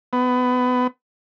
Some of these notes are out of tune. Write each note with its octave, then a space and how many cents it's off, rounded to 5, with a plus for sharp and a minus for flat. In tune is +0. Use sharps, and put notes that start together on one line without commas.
B3 +20